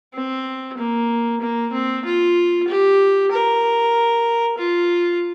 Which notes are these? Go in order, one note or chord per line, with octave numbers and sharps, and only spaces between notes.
C4
A#3
A#3
C4
F4
G4
A#4
F4